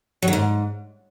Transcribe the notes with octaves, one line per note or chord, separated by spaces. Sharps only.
F#3
D#3
G#2